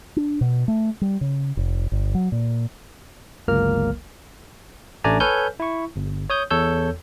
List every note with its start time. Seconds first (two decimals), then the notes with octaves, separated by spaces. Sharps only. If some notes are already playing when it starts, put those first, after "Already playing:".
0.16 D4
0.41 B2
0.68 A3
1.01 G3
1.21 C#3
1.57 F1
1.92 G1
2.15 F#3
2.32 A#2
3.48 G1 C#2 F#3 A#3 A#4 F6
5.04 A1 A3 D4 D5 G#5 A#5
5.20 A4 B4 C#5 G#5 F6 G6
5.60 E4 C#6
5.96 G1
6.30 C#5 D#6 G6
6.50 E2 A4 C#5 E6 G6